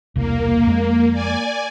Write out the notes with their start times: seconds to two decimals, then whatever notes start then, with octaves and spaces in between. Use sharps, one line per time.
0.16 E1 C2 A#3
0.67 F2 G#3
1.12 D5 G#5